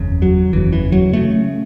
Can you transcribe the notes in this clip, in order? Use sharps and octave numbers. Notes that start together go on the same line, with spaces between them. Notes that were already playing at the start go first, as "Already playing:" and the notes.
Already playing: F#1 E2 C#3
F#3
F#1 E2 C#3 E3
E3
F#3
C#3 A3